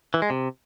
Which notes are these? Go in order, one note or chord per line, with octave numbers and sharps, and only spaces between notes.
E3
G#3
C3